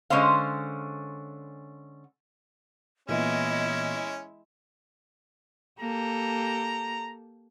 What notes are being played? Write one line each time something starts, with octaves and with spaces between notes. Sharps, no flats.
D3 G#3 C#4 F4 C5 F5
A#2 E3 G#3 B3 C#4 E4 D#5
A#3 G4 A4 A#5